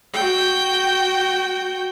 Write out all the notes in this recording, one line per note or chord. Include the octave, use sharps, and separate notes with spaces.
F#4 G5